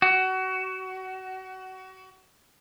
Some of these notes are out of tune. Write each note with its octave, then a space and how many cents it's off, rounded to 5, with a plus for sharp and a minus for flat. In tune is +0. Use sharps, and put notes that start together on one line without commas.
F#4 +25